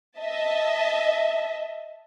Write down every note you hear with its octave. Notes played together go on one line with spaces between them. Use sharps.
D#5 E5 A5